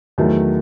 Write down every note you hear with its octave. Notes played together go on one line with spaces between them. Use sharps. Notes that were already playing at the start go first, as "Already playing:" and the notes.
E2 D#3 F#3 A3